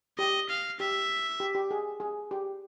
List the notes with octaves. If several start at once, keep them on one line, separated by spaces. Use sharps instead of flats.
G4 D#5
F5
G4 E5
G4
G4
G#4
G#4
G4